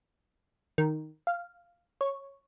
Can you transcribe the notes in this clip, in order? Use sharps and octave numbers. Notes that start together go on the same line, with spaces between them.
D#3
F5
C#5